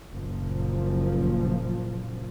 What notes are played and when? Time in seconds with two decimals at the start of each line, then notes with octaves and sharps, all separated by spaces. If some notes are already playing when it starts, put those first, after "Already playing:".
0.11 F#1 A#2 F3